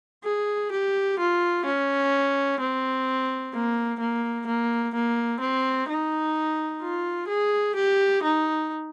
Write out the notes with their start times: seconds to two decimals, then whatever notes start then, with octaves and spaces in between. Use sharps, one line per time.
0.24 G#4
0.72 G4
1.19 F4
1.66 C#4
2.60 C4
3.54 A#3
4.00 A#3
4.47 A#3
4.95 A#3
5.40 C4
5.89 D#4
6.82 F4
7.28 G#4
7.76 G4
8.23 D#4